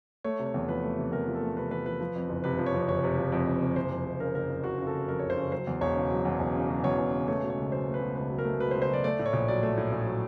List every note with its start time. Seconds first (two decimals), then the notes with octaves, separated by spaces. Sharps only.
0.24 A3 C#5
0.39 C3
0.46 C#5
0.54 E2
0.68 F3 B4
0.83 A3
0.98 C3
1.12 E2 A#4
1.27 F3
1.35 A4
1.42 A3
1.57 C3 B4
1.71 E2 B4
1.85 F3 B4
2.00 F3
2.16 F2
2.29 F#1
2.44 C3 B4
2.58 F3
2.66 C#5
2.74 F2
2.88 F#1 C#5
3.04 C3
3.18 F3
3.32 F2
3.47 F#1
3.62 C3
3.76 F#1 C5
3.91 F2
4.06 F#1
4.20 C#3 A#4
4.35 F#1 A#4
4.49 F2
4.64 F#1 F#4
4.79 C#3
4.87 A4
4.93 F#1
5.08 F2 A#4
5.19 F#1 C#5
5.30 C5
5.37 C#3 C#5
5.51 F#3 C5
5.67 E2
5.81 E1 C#5
5.96 C#3
6.10 F#3
6.25 E2
6.40 E1
6.55 C#3
6.69 F#3
6.84 E2 C#5
6.98 E1
7.13 C#3
7.28 A3 C#5
7.42 B2
7.50 C#5
7.57 C#2
7.72 F#3 C5
7.87 A3
7.94 B4
8.01 B2
8.15 C#2 B4
8.30 F#3
8.39 A#4
8.45 A3
8.60 B2 B4
8.71 C5
8.75 C#2
8.82 C5
8.89 F#3 D5
9.04 A3 D5
9.19 A2
9.26 C#5
9.33 A#1
9.48 F#3 D5
9.63 A3
9.77 A2
9.92 A#1
10.06 F#3